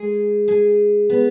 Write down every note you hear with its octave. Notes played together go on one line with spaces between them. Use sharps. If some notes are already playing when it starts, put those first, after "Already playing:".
Already playing: G#3 G#4 G#5
G#4 G#5
B3 B4